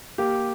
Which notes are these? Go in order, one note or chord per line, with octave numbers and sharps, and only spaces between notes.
A#3 G4